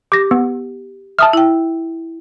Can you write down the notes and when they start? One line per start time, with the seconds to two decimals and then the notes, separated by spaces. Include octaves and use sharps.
0.12 G4 D6 A#6
0.31 B3
1.19 E5 A5 D#6 F6
1.33 E4 G5